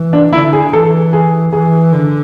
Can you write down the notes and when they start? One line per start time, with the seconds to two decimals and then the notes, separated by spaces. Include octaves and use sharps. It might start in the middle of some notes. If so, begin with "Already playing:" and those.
Already playing: E3
0.13 D4
0.33 D3 E4
0.53 G#4
0.73 E3 A4
1.13 G#4
1.53 E3 G#4
1.93 D3